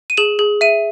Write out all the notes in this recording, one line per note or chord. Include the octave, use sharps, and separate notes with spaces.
D#7
G#4 E7
G#4
E5 D#7